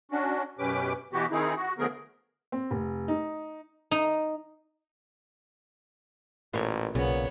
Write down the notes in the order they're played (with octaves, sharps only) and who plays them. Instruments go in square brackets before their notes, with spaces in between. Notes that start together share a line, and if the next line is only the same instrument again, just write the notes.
[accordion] C#4 D4 F#4
F#2 B2 C#4 G4 B4 D6
B2 E3 B3 F#4 G4
D#3 C4 D#4 E4 G#4
F#4
D3 F3 A3 B3 G#4 A#4
[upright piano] C4
F1
D#4
[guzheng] D#4
[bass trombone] A1 [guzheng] A#2 C5 C#5
[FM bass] B1 [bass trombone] A#2 [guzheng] C#3 [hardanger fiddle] B3 C#5